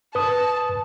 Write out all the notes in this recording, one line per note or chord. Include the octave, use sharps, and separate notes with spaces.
B4 A5 D#6